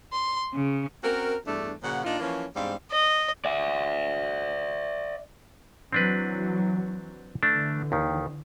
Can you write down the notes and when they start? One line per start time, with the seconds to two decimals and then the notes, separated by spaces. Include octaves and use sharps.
0.13 C6
0.54 C#3
1.04 C4 C#4 F#4 A#4
1.46 E2 G2 A3 D4
1.83 A#2 C#3 F3 F#4 F#5
2.04 A#2 D4 D#4 F4
2.19 E3 F3 A#3 C#4
2.55 E2 G#2 G3 C4 D4 F5
2.92 D#5
3.45 D5 E5
5.93 E3 F#3 C4 D4 B4
7.43 D3 E3 A3 D4
7.92 D#2 D#3